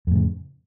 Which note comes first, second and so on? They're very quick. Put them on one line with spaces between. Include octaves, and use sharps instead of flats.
F2 A2 C#3